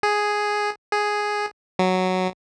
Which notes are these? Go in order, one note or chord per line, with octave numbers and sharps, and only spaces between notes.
G#4
G#4
F#3